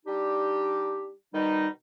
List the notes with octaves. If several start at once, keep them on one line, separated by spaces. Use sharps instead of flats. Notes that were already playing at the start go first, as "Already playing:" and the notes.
G3 D4 D#4 G4
B2 D#3 G3 D#4